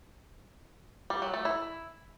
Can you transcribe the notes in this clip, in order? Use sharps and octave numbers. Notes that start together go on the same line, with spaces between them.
G3
F#3
A3
E4